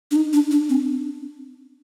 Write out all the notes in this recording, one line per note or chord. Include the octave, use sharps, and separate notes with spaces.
D4
D#4
D4
D4
C4